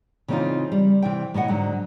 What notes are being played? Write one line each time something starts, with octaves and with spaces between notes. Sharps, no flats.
C#3 E3 C4 D4 D#4 F4
G3
C3 E3 G5
A2 E4 D#5 F#5
G#2 D3 F#3